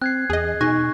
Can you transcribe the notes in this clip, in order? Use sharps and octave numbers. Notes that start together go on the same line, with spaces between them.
C4 F#6 G#6 C7
E2 G#4 D#5
B2 D#4 G#5 C#6 F#6 A#6